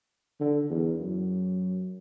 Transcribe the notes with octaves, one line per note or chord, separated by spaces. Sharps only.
D3
E2
F#2